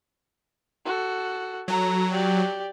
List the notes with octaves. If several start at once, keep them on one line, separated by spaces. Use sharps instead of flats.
F#4 A4
F#3 A4 A#5
G4 D5